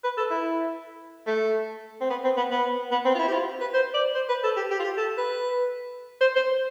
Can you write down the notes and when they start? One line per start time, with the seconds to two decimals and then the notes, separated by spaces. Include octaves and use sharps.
0.04 B4
0.18 A4
0.30 E4
1.27 A3
2.01 C4
2.10 B3
2.24 C4
2.37 B3
2.51 B3
2.91 B3
3.05 C4
3.15 F4
3.19 E4
3.27 G4
3.33 F4
3.61 B4
3.74 C5
3.94 D5
4.15 C5
4.29 B4
4.44 A4
4.57 G4
4.71 G4
4.79 F4
4.84 G4
4.97 A4
5.18 B4
6.21 C5
6.36 C5